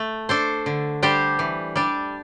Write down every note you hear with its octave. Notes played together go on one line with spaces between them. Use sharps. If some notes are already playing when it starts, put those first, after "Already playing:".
Already playing: A3
D4 A4 C5
D3
G3 D4 G4 C5
E3
G3 D4